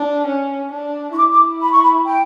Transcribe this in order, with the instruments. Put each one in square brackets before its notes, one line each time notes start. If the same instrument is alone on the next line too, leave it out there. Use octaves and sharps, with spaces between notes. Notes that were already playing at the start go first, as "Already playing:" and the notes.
Already playing: [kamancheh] D4
C#4
D4
[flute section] C#6
[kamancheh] E4 [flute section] D6
[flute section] D6
B5
C#6
B5
G5